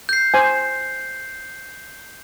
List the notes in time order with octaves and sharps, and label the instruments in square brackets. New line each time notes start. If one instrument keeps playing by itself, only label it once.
[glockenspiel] G6 C7
[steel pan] C5 G#5